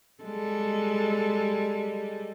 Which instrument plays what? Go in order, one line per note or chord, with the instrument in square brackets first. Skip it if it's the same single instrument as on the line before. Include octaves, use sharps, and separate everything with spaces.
[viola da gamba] G3 G#3 A4